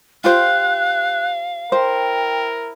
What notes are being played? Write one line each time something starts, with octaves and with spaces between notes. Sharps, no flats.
F4 G4 C5 F5 F#6
E4 A#4 C5 G5